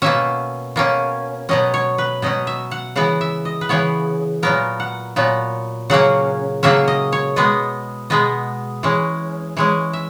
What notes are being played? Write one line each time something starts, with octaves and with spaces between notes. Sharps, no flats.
B2 A#3 C#4 E5
B2 A#3 C#4
B2 F#3 C#4 D#5
C#5
B4
B2 F#3 C#4 D#5
E5
F#5
C#3 E3 B3 F#5
E5
D#5
B4
C#3 E3 B3 C#5
A#2 F#3 B3 A#4
F#5
A#2 F#3 B3
C#3 F#3 A#3 C#4 F#5
C#3 F#3 A#3 C#4 E5
D#5
C#5
B2 G#3 B3 D#5
B2 G#3 B3 D#5
E3 G#3 C#4
E3 G#3 C#4 C#5
E5